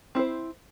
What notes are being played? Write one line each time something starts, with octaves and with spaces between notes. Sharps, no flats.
C4 E4 C5